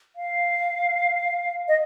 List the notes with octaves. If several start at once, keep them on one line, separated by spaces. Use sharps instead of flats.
F5
D#5